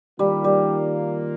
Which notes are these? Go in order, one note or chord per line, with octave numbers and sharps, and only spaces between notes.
D#3 G3 A#3 F4
G3